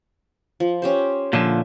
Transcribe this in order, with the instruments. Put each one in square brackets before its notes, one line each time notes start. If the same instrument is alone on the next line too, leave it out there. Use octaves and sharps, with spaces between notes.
[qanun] F3
C#4 G4 C5
[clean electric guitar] A#2 D3 F3 [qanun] E5